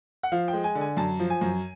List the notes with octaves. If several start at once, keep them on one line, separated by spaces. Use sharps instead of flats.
F#5
F3 F5
G5
G#3
G#5
D3
G#5
F#2 A5
F3
G#5
F#2